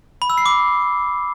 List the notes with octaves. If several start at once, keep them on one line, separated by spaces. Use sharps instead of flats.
B5
E6
C7
D6